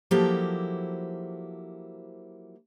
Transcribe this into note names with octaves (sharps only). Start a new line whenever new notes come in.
F3 F#3 A#3 E4 G4 A4